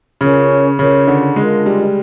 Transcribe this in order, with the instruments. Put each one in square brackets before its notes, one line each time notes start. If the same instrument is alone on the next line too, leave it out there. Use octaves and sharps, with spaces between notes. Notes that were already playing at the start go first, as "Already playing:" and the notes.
[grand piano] C#3 [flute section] C#4 F4 A#4 C#5
[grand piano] C#3 [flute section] C#4 F4 A#4 C#5
[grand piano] D3
[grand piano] G#3 [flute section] D4 F4 A#4 D#5
[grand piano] G3